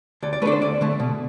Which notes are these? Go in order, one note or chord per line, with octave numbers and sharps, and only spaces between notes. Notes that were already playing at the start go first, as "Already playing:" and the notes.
D2 D5
D5
D3 A3 B4 D5
C5
D2 D5
D3 A3
B2